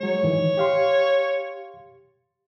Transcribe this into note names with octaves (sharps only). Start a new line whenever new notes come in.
F#3 G#3 C#5
G#2 D#3 E3
G4 F5 C6